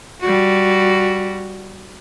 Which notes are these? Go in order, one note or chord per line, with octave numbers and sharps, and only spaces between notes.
G3 F#4